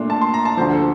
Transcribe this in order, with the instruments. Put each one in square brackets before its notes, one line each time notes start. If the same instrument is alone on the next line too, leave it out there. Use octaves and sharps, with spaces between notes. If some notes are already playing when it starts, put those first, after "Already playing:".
Already playing: [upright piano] A#2 A3 D4 [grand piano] C6
[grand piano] A5
C6
A#5
A5
[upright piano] D2 D3 F3 [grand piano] C5
[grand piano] A4